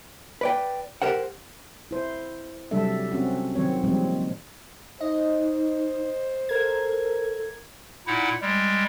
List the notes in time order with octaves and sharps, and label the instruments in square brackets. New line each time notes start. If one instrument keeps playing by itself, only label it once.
[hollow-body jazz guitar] B4 D5 G5
G4 A#4 C5 F#5
[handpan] E4 C5
C3 F#3 G3 D4 A4 E5
C4 C#4 F#4
D#3 F#3 C4 C#5
A#2 F3 G3 G#3 C4
[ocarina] D#4 [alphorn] C5 [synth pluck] D#5
[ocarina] A4 [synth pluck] A#4 G#6
[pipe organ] A#2 D#4 E4 F#5
G3 G#3